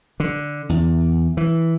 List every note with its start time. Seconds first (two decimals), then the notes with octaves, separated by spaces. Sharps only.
0.20 D3
0.69 E2
1.37 E3